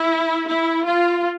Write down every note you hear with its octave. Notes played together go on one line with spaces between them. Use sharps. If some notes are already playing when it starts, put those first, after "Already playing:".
Already playing: E4
E4
F4